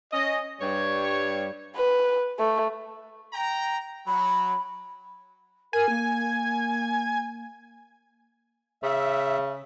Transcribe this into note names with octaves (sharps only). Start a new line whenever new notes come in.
C#4 D#5
G2 G3 C#5
B4
A3
G5 A#5
F#3 B5
A#4 G#5
A#3
C#3 E5